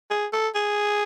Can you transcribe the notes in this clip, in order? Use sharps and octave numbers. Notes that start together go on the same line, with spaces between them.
G#4
A4
G#4